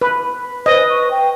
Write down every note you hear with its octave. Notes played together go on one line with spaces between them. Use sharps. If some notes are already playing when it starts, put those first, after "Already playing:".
B4
B4 C5 D#5
C#6
G5